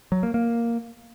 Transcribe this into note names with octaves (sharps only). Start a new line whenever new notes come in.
F#3
A#3
A#3